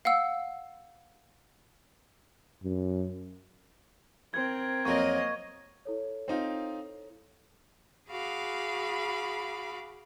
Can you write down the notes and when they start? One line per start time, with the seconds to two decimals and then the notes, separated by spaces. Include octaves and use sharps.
0.05 F5 F#5 E6
2.64 F#2
4.34 C4 A#4 G#6
4.85 F2 F#3 A#3 D#5 C#6
5.85 E4 A4 C#5
6.28 C4 D#4 F4
8.10 F#4 G#4 F5 B5 D6